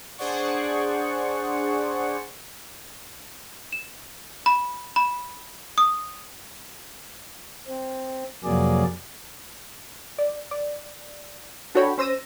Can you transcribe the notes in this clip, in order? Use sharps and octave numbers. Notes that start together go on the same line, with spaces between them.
D4 G#4 C5 D5 F#5 C#6
E7
B5
B5
D#6
C4
F2 C3 F#3 A#3 G#4 D5
D5
D5
D4 F#4 A4 C#5 G5 B5
C#4 C5 E6 A#6 D#7